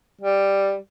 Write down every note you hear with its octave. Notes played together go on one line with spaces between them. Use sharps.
G3